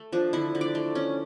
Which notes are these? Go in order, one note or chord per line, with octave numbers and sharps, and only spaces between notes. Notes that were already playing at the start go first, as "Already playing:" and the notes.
Already playing: A3
F3 D4
D3 E4
D3
D5
A3
C#4